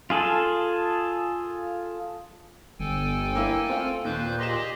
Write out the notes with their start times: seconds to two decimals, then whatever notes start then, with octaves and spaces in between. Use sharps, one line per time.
0.10 F4 G#4 A4
2.80 G1 A4 G5 G#5
3.35 A#3 E4
3.69 A3 C4 F4
4.05 D#2 A#2 B4 C5 G6
4.39 G4 G#4 D#5 C6 E7